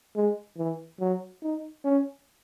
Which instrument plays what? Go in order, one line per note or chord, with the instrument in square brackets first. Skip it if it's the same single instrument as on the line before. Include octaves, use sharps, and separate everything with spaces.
[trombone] G#3
E3
F#3
D#4
C#4